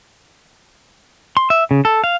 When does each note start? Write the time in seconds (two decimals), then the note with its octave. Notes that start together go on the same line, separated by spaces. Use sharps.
1.37 C6
1.50 E5
1.71 C#3
1.85 A4
2.04 F5